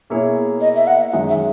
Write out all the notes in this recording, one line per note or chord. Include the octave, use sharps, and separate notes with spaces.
B2 A#3 E4 G#4 C#5
D#5
E5
F#5
F#2 D#3 G#3 E5
E5